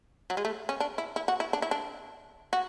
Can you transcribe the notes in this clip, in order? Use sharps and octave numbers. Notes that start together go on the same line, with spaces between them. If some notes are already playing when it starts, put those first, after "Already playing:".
F#3
G#3
A3
C#4
D4
E4
E4
F#4
E4
D4
E4
D4
F#4